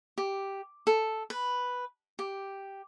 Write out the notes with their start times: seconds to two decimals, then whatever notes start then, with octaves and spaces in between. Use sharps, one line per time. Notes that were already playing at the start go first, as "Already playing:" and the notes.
0.18 G4
0.87 A4
1.30 B4
2.19 G4